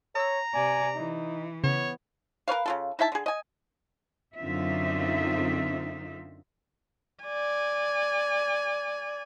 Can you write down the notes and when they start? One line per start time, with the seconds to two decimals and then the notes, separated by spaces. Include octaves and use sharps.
0.15 C#5 A#5 D#6 E6
0.54 C3 D5 G#5
0.96 E3 D#4
1.64 C#3 B3 C#5
2.48 A#4 B4 C#5 F5
2.66 C#3 F4 A4
2.99 D#4 E4 E5 A5
3.12 D3 G#4
3.26 D#5 G#5
4.36 F#2 D3 C4 D#4 F4 E5
7.24 D5 G#5